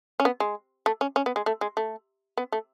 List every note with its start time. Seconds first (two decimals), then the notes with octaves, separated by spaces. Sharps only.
0.20 C#4
0.25 B3
0.40 G#3
0.86 A3
1.01 C#4
1.16 C#4
1.26 B3
1.36 G#3
1.46 A3
1.61 G#3
1.77 A3
2.38 B3
2.52 A3